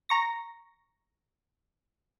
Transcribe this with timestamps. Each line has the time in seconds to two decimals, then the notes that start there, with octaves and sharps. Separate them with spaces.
0.09 A#5 C#6 A#6